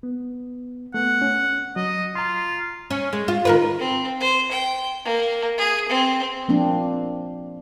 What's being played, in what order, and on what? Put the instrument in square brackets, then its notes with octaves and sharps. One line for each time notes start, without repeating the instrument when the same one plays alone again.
[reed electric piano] B3
[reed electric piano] A3 B3 [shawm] F#5
[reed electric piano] C#4
[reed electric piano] F#3 [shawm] D#5
[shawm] F4 [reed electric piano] A#5 C6
[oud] C#4
G#3
F4
D#3 A#4 B4
[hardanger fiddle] C4
C5
G5
A#3
G#4
C4
[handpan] F3 A#3 C4 D4